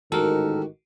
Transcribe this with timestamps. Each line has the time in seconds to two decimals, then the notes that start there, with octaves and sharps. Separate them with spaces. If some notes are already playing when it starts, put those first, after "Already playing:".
0.12 A1 G#2 D#3 F#4 G4 A4 A#4